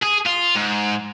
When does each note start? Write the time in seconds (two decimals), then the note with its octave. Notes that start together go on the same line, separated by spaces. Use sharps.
0.03 G#4
0.26 F4
0.56 G#2